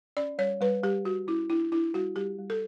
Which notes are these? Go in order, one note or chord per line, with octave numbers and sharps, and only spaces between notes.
C#4 D5
G3 C#5
G3 B4
G3 G4
G3 F#4
C#4 E4
D4 E4
D4 E4
G3 F#4
G3 G4
G3
A4